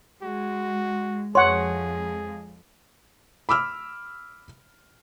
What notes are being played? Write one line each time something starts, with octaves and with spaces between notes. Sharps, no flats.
G#3 F#4
F2 F3 G#3 G#4 C#5 F#5 C6
B5 D6 E6 F6